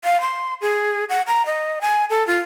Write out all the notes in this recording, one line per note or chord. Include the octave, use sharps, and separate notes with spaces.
F5
C6
G#4
F#5
A#5
D#5
G#5
A4
F4